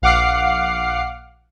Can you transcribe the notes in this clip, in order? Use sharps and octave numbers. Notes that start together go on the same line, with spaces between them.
A#1 F5 F#5 D6 F6 C7